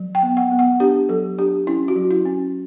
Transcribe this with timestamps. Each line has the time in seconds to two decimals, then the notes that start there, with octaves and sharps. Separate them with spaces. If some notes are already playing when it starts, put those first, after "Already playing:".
Already playing: F#3
0.15 G5
0.22 B3
0.37 F#5
0.51 B3
0.59 F#5
0.80 D4 G4
1.09 F#3 A4
1.38 D4 G4
1.67 C#4 E4
1.88 F#4
1.96 F#3
2.11 E4
2.25 C#4